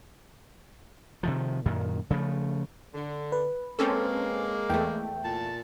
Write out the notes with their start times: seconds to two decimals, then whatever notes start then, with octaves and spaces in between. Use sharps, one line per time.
1.23 C3 D#3 F3
1.66 F#2 A#2 D#3
2.10 C#3 F3 G#3 A3
2.94 D3
3.32 B4
3.79 G#3 A#3 C4 C#4 A4
4.70 E2 A3 G5
5.24 A#2 A5